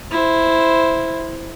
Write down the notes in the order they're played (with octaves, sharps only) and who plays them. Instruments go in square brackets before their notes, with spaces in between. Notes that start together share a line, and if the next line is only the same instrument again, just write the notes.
[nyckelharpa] E4 C5